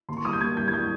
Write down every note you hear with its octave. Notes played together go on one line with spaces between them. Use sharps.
D#2 C6
C#6
G3 D#6
G6
D#2 G#6
G3 G6
G#6
G3 G6